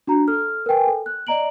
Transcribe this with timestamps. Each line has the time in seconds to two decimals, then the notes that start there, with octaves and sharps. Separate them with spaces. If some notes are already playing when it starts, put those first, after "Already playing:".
0.07 D4 F#4 A#5
0.28 A4 F6
0.66 A#4 B4 G5 G#5
0.87 A4
1.06 F#6
1.27 D5 D#5 A#5 D7 F#7